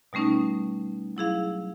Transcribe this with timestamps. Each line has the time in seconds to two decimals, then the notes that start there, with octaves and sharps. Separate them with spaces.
0.13 B2 G3 A3 C#4 D#4
1.17 F#3 E4 G#4 F5